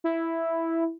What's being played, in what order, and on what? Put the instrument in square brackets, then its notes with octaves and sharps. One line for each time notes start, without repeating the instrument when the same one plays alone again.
[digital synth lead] E4